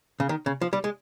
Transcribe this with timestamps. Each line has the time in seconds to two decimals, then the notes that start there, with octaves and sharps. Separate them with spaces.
0.20 C#3
0.29 D#3
0.46 C#3
0.61 F3
0.73 G3
0.84 G#3